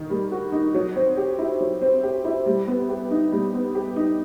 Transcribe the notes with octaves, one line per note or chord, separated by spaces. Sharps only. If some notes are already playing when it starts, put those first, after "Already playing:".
Already playing: D#3
G3
F#4
D#4
F#3
C4
G4
E4
F#3
C4
G4
E4
G3
B3
G4
D#4
G3
B3
G4
D#4